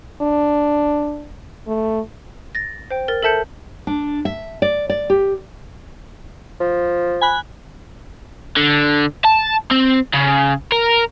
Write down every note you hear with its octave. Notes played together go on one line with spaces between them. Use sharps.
D4
A3
A6 A#6
C5 G5
A#4 A6
A4 A#4 E5 A5 G6 C#7
D4
E5
D5
D5
G4
F3
G#5 B5 F#6
D3
A5
C4
C#3
A#4